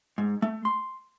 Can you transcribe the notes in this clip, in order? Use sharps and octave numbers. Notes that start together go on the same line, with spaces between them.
G#2
A3
C6